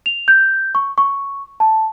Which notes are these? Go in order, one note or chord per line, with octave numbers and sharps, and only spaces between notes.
F7
G6
C#6
C#6
A5